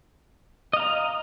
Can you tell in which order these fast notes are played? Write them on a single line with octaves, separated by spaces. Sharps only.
D#5 F5 A#5